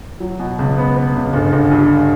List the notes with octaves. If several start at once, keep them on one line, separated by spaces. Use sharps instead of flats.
F#3
B2
C#2
B3
B3
C#2
G1
G1
G2